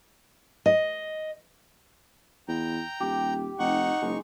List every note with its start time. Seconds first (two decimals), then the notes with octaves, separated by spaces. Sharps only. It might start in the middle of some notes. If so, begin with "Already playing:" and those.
0.66 D#5
2.48 E2 G5 A#5
3.00 D#1 G4
3.59 F1 D#4 F#5 C#6
4.02 F#1 G#3